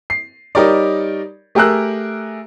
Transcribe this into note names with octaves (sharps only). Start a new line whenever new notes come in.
C7
G3 D#4 G4 A#4 C#5 D5
A3 G4 G#4 A#4 E6 F#6